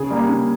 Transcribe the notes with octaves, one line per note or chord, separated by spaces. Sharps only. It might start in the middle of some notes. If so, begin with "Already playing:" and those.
Already playing: C#3 G#4
G3 A#3
C#3